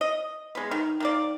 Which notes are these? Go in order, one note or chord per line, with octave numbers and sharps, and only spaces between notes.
D#5
G#3 B3
D#3
D#3 A#3 D5